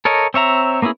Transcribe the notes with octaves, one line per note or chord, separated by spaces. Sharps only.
A4 A#4 C#5 D#5
C4 C#5 E5 A#5
A#3 B3 C#4 E4 G#4